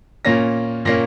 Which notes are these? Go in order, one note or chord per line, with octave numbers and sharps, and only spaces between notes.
A#2 A#3 C#4 A#6
A#2 A#3 C#4 A#6